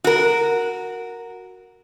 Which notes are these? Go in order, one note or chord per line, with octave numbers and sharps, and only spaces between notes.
F#4 A#4